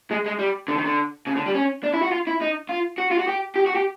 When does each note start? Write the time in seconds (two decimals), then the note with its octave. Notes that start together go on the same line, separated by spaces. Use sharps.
0.11 G#3
0.26 G#3
0.39 G3
0.68 D3
0.77 D#3
0.85 D3
1.27 C#3
1.36 D3
1.46 G3
1.55 C#4
1.84 D4
1.94 E4
2.03 F#4
2.12 F4
2.27 E4
2.42 D#4
2.69 F4
2.98 F#4
3.11 F4
3.19 F#4
3.28 G4
3.56 G4
3.66 F#4
3.75 G4